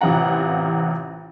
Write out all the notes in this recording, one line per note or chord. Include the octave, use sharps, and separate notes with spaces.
A1 C3 E3 F4 F#5 A#5